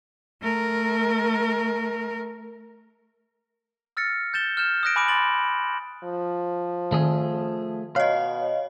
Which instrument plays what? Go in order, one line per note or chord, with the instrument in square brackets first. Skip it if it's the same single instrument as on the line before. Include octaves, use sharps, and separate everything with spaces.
[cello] A3 A#4
[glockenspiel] E6 F6 A6 A#6 C#7
G6 A6 E7 G7
F6 G6 E7
D#6 F6 F#6 A#6 D7
G#5 B5 D6 F6 D7
B5 C6 A6 D7 F#7
[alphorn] F3
[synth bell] D#3 [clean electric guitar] A3 G#4
[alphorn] B2 [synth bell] C#5 D#5 [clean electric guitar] F5